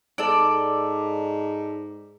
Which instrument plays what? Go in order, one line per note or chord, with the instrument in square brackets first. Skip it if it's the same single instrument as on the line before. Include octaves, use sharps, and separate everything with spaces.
[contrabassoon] G#2 [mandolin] A4 D5